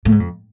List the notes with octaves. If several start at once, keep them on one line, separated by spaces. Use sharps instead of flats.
A2
G#2
F2